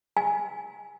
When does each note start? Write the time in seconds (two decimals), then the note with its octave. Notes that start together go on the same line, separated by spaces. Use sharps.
0.17 G#5